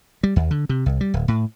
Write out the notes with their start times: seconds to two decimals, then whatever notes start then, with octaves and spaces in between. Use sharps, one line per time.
0.23 G3
0.36 D#2
0.51 D3
0.69 C3
0.86 C2
1.01 G3
1.14 D1
1.28 A2